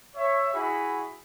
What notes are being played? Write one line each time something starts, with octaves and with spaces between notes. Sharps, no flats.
C#5 E5
E4 F#4 G#4 B5